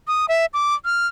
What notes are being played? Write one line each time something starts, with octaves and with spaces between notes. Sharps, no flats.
D#6
E5
D6
F6